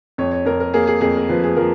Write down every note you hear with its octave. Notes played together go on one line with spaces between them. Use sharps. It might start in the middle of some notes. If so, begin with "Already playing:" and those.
F2 C#5
C#5
F2 A#4
A#4
A#3 G#4
G#4
F2 G#4
A#4
F3 B4
G#4
F3 A#4